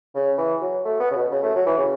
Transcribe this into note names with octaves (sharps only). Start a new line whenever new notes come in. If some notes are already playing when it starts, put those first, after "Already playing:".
C#3
E3
F#3
A3
B3
C#3
B2
C#3
A3
F#3
E3
C#3